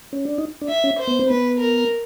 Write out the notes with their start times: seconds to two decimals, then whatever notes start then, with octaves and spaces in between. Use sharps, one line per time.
0.13 C#4
0.25 D4
0.38 D#4
0.62 D4
0.68 E5
0.84 C#4
0.99 C5
1.07 B3
1.19 C4
1.29 B3 B4
1.60 A#4